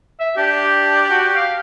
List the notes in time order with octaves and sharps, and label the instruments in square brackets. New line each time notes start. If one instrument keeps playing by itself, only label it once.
[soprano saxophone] E5
[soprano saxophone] D4 [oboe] G4
[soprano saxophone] F#4
F5